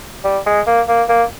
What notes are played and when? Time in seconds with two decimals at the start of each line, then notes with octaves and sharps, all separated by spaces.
0.24 G3
0.46 G#3
0.67 A#3
0.88 A#3
1.09 A#3